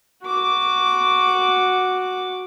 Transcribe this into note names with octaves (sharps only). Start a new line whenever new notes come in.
F#4 D6